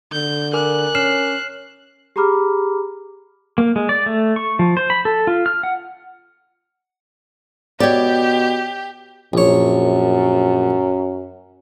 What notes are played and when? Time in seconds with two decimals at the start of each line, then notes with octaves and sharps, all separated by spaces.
0.12 D3 G6
0.53 A#4 G#5 D6 F#6
0.95 C#4 F6 C7 E7
2.16 G4 G#4 A#5 B5 D6 F6
3.58 A#3
3.76 G#3
3.89 D5
4.06 A3
4.36 C#6
4.59 F3
4.77 C5
4.90 B5
5.05 A4
5.27 F4
5.46 F6
5.63 F#5
7.80 B2 G4 C#5 D5
9.33 A#1 F#2 C#5